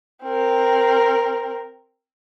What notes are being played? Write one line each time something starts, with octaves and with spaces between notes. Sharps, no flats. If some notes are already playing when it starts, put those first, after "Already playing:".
C4 A#4